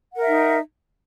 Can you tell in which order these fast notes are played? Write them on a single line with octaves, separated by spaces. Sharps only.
F#5 A#4 E5 D#4